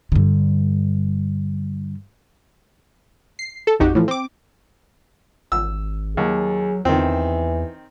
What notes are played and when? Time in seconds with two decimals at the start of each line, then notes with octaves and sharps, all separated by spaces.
0.12 G2 D3
3.39 C7
3.67 A4
3.80 A1 F2 D#4 F#4 G4
3.95 A2 E3 F3
4.08 C4 D6
5.52 G#1 E6
6.17 D#2 F#3 G#4
6.85 E2 D#3 E3 C4